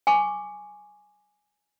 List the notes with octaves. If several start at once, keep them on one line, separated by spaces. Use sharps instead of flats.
G#5 C#6 D6